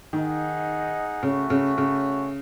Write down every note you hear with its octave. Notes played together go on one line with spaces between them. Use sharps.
D#3 D#4 G#4 D#5 F#5
C#3 A3 C#4 F#4
C#3
C#3